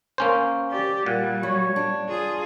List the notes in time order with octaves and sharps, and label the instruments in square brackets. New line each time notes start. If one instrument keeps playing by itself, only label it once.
[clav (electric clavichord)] A#3 C#4 C5
[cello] G4 [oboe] D5
[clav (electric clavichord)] A#2 [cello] G3 [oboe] F#5
[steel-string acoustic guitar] F#3 [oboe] C#5
[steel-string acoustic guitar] D4
[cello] F4 G#4